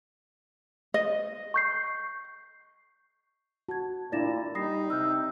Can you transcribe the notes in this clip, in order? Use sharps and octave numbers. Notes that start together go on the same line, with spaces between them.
D#5
C#6 G6 C7
F#4 A5 G#6
A#2 D4 E4 D5 A6 A#6 E7
G3 D#4 B5 D#6 A#6 C7
C3 E6 F6 G6